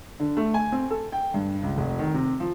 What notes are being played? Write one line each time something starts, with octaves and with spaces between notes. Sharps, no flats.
D3
A3
G#5
C4
A4
G5
G2
C#2
F1
D#3
C3
F3